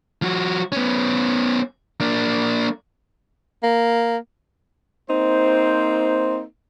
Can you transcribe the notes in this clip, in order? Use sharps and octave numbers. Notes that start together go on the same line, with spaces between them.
F3 F#4
B3 C#4
A#3 D4
A#3
A#3 C4 D#4 C5